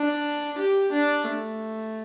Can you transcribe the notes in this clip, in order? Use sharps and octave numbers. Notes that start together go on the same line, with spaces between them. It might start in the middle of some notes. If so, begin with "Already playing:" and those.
Already playing: D4
G4
D4
A3